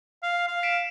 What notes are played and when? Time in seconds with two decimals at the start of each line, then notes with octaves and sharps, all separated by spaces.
0.23 F5
0.47 F5
0.63 B6 D7 E7